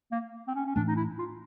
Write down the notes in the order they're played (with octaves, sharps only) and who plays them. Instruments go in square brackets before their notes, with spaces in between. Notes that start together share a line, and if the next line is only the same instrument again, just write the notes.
[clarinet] A#3
C4
C#4
C#4
[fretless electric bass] A2 E3 A3 [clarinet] D4
[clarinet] D#4
E4
F4